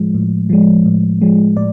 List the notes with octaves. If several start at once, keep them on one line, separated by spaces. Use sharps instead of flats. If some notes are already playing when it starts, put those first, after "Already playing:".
Already playing: A2 F3 G#3
A2
F3 G#3
A2
F3 G#3
A2 D5